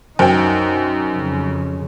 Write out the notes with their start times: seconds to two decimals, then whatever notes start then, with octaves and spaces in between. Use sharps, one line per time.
0.19 F#2 D#4 C5 G5
1.14 F2 C#3